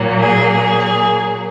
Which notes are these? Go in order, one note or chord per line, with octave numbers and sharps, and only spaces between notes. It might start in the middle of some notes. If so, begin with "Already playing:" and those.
Already playing: A#2 F#3 A#3
G#4
G#4